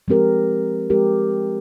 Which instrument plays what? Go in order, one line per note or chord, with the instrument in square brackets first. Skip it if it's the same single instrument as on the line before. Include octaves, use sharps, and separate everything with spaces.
[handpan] F3 G#3 C4 G4 A#4
F3 G#3 C4 G4 A#4